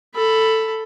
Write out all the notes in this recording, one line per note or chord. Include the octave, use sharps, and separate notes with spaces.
A4 B5